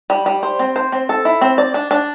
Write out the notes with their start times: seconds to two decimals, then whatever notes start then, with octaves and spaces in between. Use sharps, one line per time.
0.10 G3
0.26 G3
0.43 C5
0.59 C4
0.76 C5
0.92 C4
1.09 A4
1.25 E4
1.41 C4
1.58 D5
1.74 D4
1.91 D4